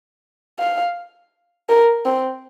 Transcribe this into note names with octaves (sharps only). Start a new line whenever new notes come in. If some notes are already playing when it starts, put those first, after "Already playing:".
F5
A#4
C4